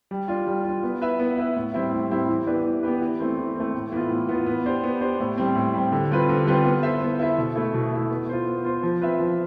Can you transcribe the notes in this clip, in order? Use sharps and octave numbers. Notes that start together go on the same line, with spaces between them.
G3
D4 F4
G3
D4 F4
B3
E4 B4 E5
B3
E4 B4 E5
A2
G3 C4 E4
A2
G3 C4 E4
E3
B3 D4 G4 B4
E3
B3 D4 G4 B4
E3
A3 C4
E3
A3 C4
A2
E3 B3 F4
A2
E3 B3 F4
B3
D4 G4 C5
B3
D4 G4 C5
A2
G3 C4
A2
G3 C4
D3
G3 C4 F4 B4
D3
G3 C4 F4 B4
B3
E4 A4 C5 E5
B3
E4 A4 C5 E5
B2
A3 E4
B2
A3 E4
B3
F4 C5
B3
F4 C5
F3
C4 F4 B4 E5
F3